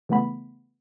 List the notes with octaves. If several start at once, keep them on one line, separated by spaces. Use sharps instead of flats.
C#3 E3 A3 B3 B5